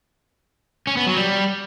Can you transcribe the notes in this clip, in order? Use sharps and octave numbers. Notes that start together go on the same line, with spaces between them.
C#4
B3
F#3
G3